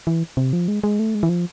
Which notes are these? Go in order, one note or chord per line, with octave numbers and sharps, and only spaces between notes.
E3
C3
F3
G#3
G#3
A3
G#3
E3
F3